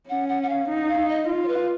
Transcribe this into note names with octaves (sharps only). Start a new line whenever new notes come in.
C#4 F#5
F#5
F#5
F5
D#4
F5
D#4
D#5
F4
C#5
B4